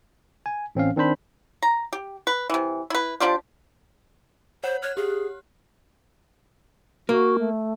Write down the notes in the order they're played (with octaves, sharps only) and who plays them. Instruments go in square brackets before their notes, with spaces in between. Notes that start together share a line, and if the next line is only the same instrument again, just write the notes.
[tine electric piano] G#5
A1 C4 C#4 F5
D#3 C4 D4 C5 B5
[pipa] A#5
G4
B4
C3 E3
E4 B4
F3 D4 F4 G4
[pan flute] C5 [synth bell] C#5 F#5
[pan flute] C#5 [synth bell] F6 F#6
[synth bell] G4 [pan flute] G#4
[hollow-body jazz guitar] A#3 [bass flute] F#4
[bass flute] A3